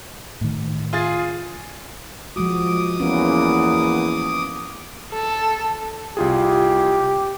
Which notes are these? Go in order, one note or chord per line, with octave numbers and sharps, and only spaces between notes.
A2 D#3
F4 G#4 A6
F3 G#3 F#4 D6 D#6
E2 A#3 B3 C#4
A4
C2 F4 G4 G#4